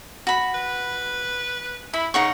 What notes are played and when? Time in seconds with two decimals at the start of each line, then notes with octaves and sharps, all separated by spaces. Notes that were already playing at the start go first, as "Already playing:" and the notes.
0.27 F#4 B5
0.54 B4
1.93 E4 B5
2.14 C#3 D#4 F#5 C#6